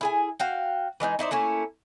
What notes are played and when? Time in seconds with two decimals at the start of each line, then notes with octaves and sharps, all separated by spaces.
0.01 E4 G#4 G#5
0.40 F#4 F5 G5
1.00 E3 G#3 C#4 D#4
1.19 D#4 E4 C5 D5
1.31 A3 A#3 C#4 E4